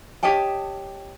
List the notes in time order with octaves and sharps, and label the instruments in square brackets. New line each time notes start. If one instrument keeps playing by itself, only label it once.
[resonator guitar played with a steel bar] G4 C#5 D#5 G5 A5